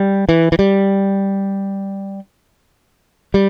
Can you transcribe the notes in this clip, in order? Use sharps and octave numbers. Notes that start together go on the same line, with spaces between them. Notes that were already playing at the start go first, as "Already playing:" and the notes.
Already playing: G3
E3
E3
G3
G3